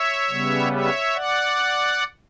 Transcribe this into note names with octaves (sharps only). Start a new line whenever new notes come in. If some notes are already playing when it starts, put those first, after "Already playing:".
Already playing: C#5 E5
C#3 G3 B3
C#5 E5
D5 F#5